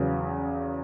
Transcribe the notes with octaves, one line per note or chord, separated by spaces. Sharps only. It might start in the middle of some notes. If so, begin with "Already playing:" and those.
Already playing: E2 C#3 F#3